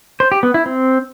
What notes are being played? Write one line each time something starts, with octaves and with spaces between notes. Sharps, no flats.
C5
G4
B3
E4
C4